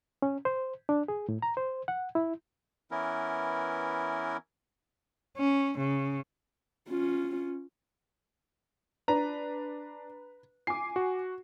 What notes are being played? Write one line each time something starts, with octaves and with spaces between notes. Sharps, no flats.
C#4
C5
D4
G#4
A2
A#5
C5
F#5
E4
E3 B3 C#4 E4 A#4
C#4
C#3
C#4 F4
D4 B4 A#5
G#5 D6 C7
F#4